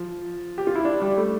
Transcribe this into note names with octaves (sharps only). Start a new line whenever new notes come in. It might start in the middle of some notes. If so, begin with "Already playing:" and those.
Already playing: F3
G4
F4
E4
D4
G3
A3